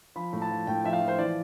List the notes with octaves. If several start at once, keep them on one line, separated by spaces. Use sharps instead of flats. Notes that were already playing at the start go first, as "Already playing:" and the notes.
F3 B5
A2
A5
F3
A2 G5
F3 E5
F5
F3
C5
E3 D5